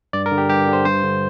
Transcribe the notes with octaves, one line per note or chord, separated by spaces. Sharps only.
G2 D5
A#4
D3
G4
G2 G4
D3
C5
G2 C5
D3